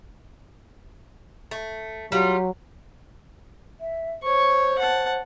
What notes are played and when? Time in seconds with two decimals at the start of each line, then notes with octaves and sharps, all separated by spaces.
1.51 A3
2.12 F#3 G3 F4
3.81 E5
4.23 C5 C#5 C#6
4.78 F#5 A5